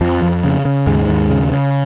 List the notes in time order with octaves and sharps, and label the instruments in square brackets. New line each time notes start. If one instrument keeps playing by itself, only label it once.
[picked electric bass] F2 F3
F2
C#3
C#3
D#2 G#2 G#3
D#2
C#3
C#3